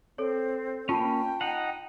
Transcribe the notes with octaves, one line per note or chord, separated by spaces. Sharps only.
C4 A4 C#5
A#3 C#4 F4 G5 A5 B5
D#4 F#5